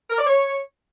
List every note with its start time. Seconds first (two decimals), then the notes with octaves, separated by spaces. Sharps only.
0.10 A#4
0.18 D5
0.26 C#5